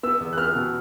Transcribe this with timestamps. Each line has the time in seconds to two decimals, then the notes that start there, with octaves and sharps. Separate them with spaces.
0.03 B3 E6
0.20 E2
0.33 F#6
0.37 B3 F6
0.55 B2